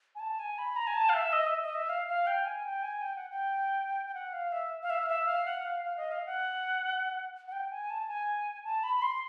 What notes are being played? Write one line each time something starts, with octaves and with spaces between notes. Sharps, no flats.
G#5
A5
G#5
B5
A#5
G#5
A5
F5
E5
D#5
E5
D#5
E5
F5
F5
G5
G#5
G5
G#5
G5
F#5
G5
G5
F#5
F5
E5
F5
E5
F5
E5
F5
F#5
F5
F5
D#5
F5
F#5
F#5
G5
G#5
A5
G#5
A5
B5
B5
C6